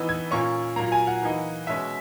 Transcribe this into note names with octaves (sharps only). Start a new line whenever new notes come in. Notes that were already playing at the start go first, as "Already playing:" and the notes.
Already playing: E3 B3 D#4 E6
G#6
A#2 A#3 C#4 C#6
A#2 F#3 A#3 A#5
G#5
F#5
E3 A#3 D#4
B2 G#3 C#4 E5